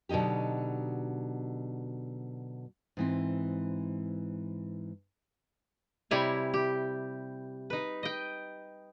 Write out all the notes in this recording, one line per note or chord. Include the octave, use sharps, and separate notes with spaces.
B2 D3 F#3 D#4 G4
G#2 E3 C4
C3 G3 E4 C#5 G#5
G4
D#4 B4
D#5 G5